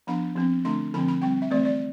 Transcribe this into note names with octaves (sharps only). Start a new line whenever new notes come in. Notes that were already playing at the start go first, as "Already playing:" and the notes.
F3 B3 D4 B5
F3 C4
D3 A3 D4 C6
D3 F3 C4 B5
B5
G3 C4 G5
E5
E3 A3 C4 D5
D5